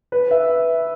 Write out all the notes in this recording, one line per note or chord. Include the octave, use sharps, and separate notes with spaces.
B4
E5